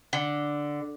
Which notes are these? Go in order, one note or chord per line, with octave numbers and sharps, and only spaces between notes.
D3